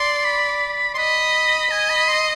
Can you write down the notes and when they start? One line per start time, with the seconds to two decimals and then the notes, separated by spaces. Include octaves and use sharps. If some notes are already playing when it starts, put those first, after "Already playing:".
Already playing: D5 C6
0.25 B5
0.94 C6
0.98 D#5 B5
1.71 D#5 G#5
1.90 B5
2.08 C6